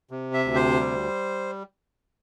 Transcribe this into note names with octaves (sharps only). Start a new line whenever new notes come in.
C3
E5
D2
C5
G3